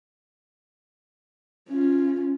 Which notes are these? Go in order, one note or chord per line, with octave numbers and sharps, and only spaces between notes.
C#4 F4